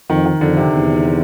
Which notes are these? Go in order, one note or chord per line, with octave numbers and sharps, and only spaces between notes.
F2 D#3
D#3
F2 D3
C3
E2